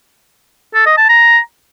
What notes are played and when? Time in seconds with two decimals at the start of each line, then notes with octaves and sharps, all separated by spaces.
0.75 A4
0.86 D#5
0.98 A5
1.09 A#5